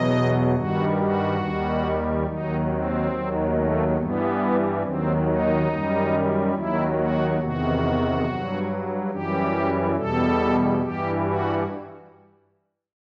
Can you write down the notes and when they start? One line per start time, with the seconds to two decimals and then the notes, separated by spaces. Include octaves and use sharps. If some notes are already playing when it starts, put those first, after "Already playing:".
Already playing: E2 B2 F#3 D#5
0.55 G2 D#3 G3 F#4
0.98 F#4
1.41 D#2 D#3 G3
2.26 D#2 D#3 F#3 D#4
2.69 C4
3.12 D#2 D#3 F#3
3.54 A3
3.97 G2 E3 G3 B3
4.83 D#2 D#3 F#3 C4
5.26 D#4
5.68 F#2 D#3 G3
6.54 D#2 D#3 F#3 E4
6.96 F#4
7.39 E2 C3 D#3 F#4
8.25 G2 F#3
9.10 F#2 E3 G3 G4
9.96 E2 B2 G3 A4
10.81 G2 E3 G3 G4
11.25 F#4